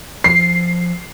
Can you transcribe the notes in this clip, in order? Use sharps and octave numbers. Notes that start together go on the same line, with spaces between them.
F3 C7